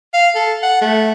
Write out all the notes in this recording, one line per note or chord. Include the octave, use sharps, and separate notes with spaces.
F5
A4
F#5
A3